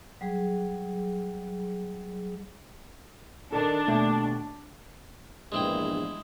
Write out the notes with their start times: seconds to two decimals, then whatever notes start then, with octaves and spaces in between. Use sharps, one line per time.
0.21 F#3 G3 G#4
3.52 D#3 D4 A4
3.87 D#2 B2 A3
5.52 A#1 E2 G2 G#3 E4 G5